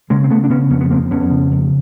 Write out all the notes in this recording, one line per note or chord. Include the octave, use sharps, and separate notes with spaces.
C#3 G#3 A#3
C4
C#3 A3 B3
D4
C#3 B3 C#4
F2 B3 C#4
B3
F2 A#3 C4
F2 B3 C#4
C#3
F2